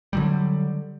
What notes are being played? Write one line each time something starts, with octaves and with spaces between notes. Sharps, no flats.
D3 F#3 G3